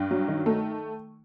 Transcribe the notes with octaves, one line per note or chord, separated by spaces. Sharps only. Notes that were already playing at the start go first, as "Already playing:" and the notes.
Already playing: G2 G5
F#3
D#3
A3